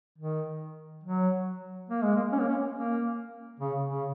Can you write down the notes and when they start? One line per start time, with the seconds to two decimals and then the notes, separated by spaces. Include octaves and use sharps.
0.18 D#3
1.04 F#3
1.90 A#3
2.02 G#3
2.16 A#3
2.32 C#4
2.40 A#3
2.48 C#4
2.74 A#3
3.60 C#3
3.88 C#3